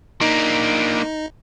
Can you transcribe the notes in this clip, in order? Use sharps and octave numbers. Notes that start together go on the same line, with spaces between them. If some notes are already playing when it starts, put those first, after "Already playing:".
A#3 D4 D#4